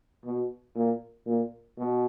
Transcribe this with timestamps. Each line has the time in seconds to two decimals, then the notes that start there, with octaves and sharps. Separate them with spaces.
0.25 B2
0.75 A#2
1.26 A#2
1.78 B2